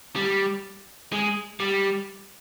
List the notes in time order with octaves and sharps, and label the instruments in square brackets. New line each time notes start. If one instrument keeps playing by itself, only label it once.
[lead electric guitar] G3
G#3
G3